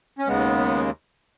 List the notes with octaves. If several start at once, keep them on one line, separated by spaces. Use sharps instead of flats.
C#4
D#2 C#3 G#3 B3